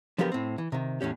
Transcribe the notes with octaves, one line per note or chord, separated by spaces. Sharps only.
D3 F3 F#3 B3 G4 A#4
A2 C4
E3
C3 D#3
E2 A2 C#4 G4